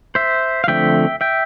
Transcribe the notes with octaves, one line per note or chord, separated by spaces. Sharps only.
C5 E5
F5
D3 F3 A3 C4 E5 G5
E5 G5